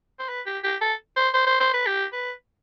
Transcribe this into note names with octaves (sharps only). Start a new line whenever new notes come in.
C5
B4
G4
G4
A4
C5
C5
C5
C5
B4
G4
B4